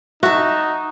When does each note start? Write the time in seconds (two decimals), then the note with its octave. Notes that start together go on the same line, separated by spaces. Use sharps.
0.23 D#4 F#4 E5 A5